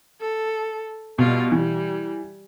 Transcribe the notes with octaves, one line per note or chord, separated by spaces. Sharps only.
A4
B2 G3 F4
E3 G3